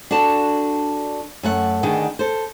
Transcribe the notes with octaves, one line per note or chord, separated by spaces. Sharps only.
D4 F#4 A4 A5
F#2 A3 F#5
D2 D#3 B3 D4 G#4 D#5
A4 C5